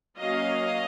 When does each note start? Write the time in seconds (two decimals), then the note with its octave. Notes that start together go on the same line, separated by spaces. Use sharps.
0.19 F#3 A#3 C#4 D#5 F5